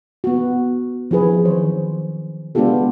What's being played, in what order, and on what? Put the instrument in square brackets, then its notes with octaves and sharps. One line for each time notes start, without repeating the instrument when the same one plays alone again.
[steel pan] B3 F#4
F3 E4 G#4 B4
D#3 E3 F#3 C5 C#5
G#3 B3 D4 F4 G4 A4